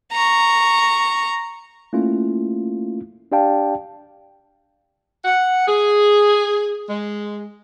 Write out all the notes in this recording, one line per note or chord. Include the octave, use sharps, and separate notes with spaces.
A#5 C#6
A3 A#3 C#4 E4 F4
D4 G4 D5 F5 G5 A5
F#5
G#4
G#3